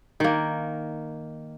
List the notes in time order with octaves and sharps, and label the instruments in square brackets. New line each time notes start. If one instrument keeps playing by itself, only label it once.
[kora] D#3 A#3